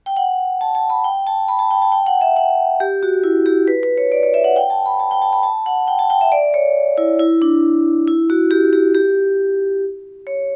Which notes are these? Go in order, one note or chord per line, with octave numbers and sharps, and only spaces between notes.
G5
F#5
A5
A5
B5
G5
A5
B5
A5
G5
A5
G5
F#5
E5
F#5
G4
F#4
E4
G4
B4
B4
C#5
D5
C#5
E5
F#5
G5
A5
B5
A5
G5
A5
B5
A5
F#5
G5
A5
G5
E5
D5
C#5
E4
E4
D4
E4
F#4
G4
G4
G4
C#5